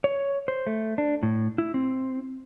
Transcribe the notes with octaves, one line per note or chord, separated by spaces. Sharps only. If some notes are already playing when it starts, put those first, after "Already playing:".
C#5
C5
A3
D4
A2
E4
C4